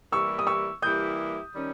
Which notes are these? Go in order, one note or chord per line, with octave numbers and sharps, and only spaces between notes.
E3 G3 A#3 E4 G4 C#6 E6
D#6
C#6 E6
E3 G3 A#3 E4 G4 D#6 G6
D#3 G3 C#4